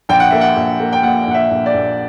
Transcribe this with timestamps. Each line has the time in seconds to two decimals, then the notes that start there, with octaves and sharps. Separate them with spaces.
0.09 A#1 G5
0.20 F#5
0.30 A#3 E5
0.41 F#5
0.56 A#1
0.80 A#3
0.93 G5
1.03 A#2 F#5
1.27 A#1 F#5
1.34 E5
1.50 A#1
1.66 D5
1.74 A#1